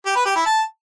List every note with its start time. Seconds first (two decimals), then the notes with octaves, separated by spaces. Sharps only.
0.06 G4
0.16 B4
0.26 G4
0.36 E4
0.46 A5